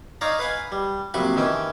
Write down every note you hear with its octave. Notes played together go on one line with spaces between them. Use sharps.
D#4 C#5 D5 F5 A#5
B4 F5 F#5 G#5
G3
A#1 C3 F#3 B5 C#6
D#3 E3 C#4 G5